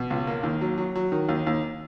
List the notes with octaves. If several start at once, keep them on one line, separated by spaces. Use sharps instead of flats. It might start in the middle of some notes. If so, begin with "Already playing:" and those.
Already playing: B2
C#2
A#3
D#2
F#3
F#3
F#3
D#3
D#2
D#2